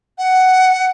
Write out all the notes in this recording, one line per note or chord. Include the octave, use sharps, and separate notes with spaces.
F#5